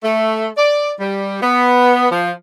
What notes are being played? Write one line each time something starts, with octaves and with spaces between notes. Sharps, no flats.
A3
D5
G3
B3
F3